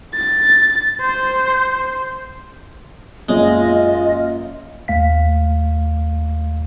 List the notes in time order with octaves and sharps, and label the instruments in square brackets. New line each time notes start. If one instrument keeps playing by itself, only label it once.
[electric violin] A6
C5
[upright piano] F#2 A#2 C#5 [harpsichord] G#3 [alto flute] F4 [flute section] D#5
[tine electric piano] D#2 A3 F5 B6